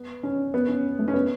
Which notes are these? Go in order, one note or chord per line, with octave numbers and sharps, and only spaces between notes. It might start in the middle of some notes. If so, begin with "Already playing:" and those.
Already playing: B3
C#4
B3
C#4
A3
C#4
B3